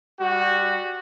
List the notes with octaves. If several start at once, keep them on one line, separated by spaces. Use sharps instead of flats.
G3 F#4